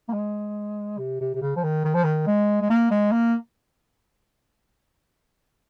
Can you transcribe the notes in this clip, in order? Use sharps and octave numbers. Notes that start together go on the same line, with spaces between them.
A#3
G#3
C3
C3
C3
C#3
F3
D#3
D#3
F3
D#3
G#3
G#3
A#3
G#3
A#3